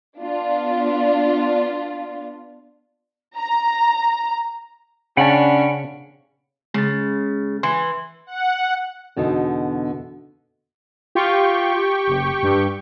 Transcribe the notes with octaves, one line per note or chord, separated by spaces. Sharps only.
B3 D4 F4
A#5
C#3 C#4 D4 F#5 G5 A5 B5
C#3 G#3 A6
E3 C6
F#5
E2 B2 D3 D#4
F4 G4 G5 C#6
F#1
G2